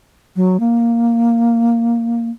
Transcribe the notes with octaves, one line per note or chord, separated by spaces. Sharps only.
F#3
A#3